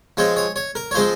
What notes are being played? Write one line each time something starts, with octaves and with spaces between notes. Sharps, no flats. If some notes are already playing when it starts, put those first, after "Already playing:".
F3 G#3 C4 C#5
C#5
C#5
A#4
C#5
F3 G#3 C4 C5